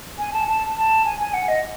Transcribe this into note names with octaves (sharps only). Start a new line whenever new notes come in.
G#5
A5
A5
A5
G#5
G#5
F#5
D#5